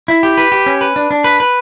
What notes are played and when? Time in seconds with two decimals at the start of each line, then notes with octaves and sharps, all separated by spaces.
0.08 E4
0.23 G4
0.38 B4
0.52 G4
0.66 C#4
0.81 B4
0.96 D4
1.11 D4
1.24 B4
1.40 B4